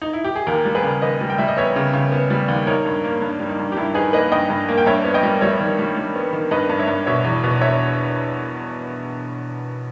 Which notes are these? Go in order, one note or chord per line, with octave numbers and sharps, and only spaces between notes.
D#4
E4
G4
G#4
D#2 G4 A#4
G3
G#4 B4
C#3
D#2 B4 D#5
G3
G5
G3 E5
D#5
B3 C#5 E5
C#3
C#3
B3
G3
D#2
D#4 A#4 C#5
G2
A#3
G2
G3
D#4
G2
G4
G2 E4
D#4 G#4 B4
A#3 B4 D#5
G2 D#5 G5
G2
A#3
G5
G2 C#5 E5
B3
D#5 G5
G3
G3 C#5 E5
D#3
G3
G3
B3
D#3
G2 B4 D#5
G2
C#5 E5
G2
B2 C#5 E5
E2
B2
C#5 E5